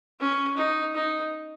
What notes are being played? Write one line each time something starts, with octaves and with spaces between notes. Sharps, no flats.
C#4
D#4
D#4